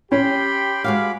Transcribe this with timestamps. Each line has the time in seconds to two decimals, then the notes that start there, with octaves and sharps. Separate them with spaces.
0.12 C#4 G4 G5 B5 C6
0.84 G#3 F#4 F5 B5 D6